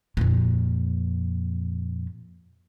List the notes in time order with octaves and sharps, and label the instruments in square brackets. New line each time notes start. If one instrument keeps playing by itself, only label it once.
[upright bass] F2 A#2